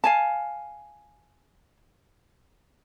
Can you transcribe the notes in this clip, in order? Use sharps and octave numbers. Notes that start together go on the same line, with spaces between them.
F5 G#5 A5